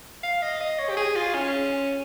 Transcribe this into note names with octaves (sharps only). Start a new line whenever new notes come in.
F5
D#5
D#5
C#5
G4
G#4
F4
C#4